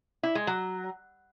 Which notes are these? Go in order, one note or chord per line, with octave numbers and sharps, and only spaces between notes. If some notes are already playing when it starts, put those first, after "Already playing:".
E4
G#3
F#3